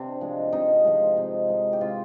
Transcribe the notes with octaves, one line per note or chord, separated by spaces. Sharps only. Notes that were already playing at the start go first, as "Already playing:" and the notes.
Already playing: C3 D4
F3 G#3
C3 D#4
F3 G#3
C3
F3 G#3
G4
C3 F4